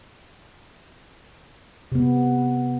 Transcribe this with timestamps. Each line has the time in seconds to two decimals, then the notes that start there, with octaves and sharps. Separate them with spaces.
1.92 C3 B3